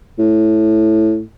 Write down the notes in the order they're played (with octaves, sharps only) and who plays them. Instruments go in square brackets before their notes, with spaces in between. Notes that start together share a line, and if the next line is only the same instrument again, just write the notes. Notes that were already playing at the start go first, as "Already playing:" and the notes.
[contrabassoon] A2